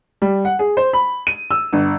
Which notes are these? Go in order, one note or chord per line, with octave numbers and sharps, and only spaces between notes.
G3
F#5
G#4
C5
B5
D#7
E6
G1